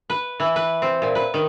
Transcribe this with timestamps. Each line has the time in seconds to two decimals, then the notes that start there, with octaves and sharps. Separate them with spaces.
0.10 B4
0.40 E3
0.56 B4
0.82 C4
1.02 A#2
1.15 B4
1.34 D#3